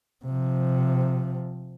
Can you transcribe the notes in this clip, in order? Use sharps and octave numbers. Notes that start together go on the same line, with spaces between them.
C3 F3